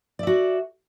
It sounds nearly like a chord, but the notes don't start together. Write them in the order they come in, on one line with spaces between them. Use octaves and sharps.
D5 E5 F#4